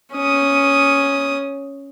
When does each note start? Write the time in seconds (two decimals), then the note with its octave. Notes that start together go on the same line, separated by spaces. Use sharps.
0.14 C#4 D#6